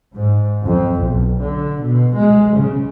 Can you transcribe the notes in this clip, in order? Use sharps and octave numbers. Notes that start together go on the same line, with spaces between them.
G#2
F2
B1
D3
B2
G#3
C#3